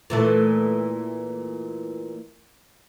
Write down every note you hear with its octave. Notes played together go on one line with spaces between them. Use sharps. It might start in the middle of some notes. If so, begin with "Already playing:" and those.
A#2 E3 A3